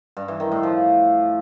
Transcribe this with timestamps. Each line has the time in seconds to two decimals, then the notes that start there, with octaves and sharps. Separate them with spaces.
0.17 G2
0.28 E3
0.40 D#3
0.52 A2
0.63 F3